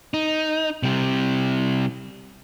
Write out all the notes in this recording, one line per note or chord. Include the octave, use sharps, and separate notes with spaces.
D#4
C3 G3